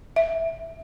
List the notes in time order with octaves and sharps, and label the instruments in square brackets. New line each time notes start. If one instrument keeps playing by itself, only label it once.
[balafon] E5